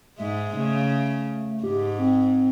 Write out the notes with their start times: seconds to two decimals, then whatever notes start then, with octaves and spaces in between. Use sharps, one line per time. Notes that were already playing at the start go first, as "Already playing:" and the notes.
0.18 G#2 G#3 E5
0.57 C#3 A3
1.64 G#2 G4
1.98 C4